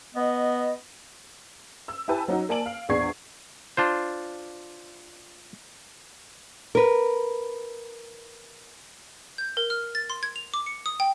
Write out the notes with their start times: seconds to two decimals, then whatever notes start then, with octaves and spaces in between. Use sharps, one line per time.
0.15 B3 D#5
1.88 E6
2.08 E4 G4 B4 G#5 A5
2.28 F#3 C#4 D#4 F#4
2.49 A#3 D5 G#5 A5 D7 F#7
2.66 F5
2.89 A#1 E2 D4 C#6 G#6 C7
3.77 D4 F4 C5
6.75 A#4 B4
9.38 G6
9.57 A#4
9.70 F6
9.95 A6
10.10 C6
10.23 G#6
10.36 F7
10.54 D6
10.66 C#7
10.86 D#6
11.00 G5